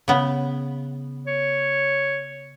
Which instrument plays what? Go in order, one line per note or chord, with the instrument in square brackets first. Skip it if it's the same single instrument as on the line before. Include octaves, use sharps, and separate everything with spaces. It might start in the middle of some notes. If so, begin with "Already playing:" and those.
[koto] C#3 B3
[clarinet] C#5